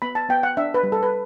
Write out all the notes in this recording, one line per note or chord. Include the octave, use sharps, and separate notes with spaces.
B3 B5
A5
B3 G5
F#5
D4 E5
B4
G3
A4
B4